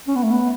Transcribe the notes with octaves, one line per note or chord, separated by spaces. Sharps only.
C#4
B3
A3
B3